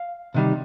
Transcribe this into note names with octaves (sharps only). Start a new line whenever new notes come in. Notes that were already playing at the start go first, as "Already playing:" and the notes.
Already playing: F5
C3 D#3 G3